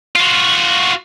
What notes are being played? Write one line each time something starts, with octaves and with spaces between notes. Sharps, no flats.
F4 F#4